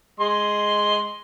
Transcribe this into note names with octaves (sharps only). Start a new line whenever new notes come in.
G#3 D#5 C6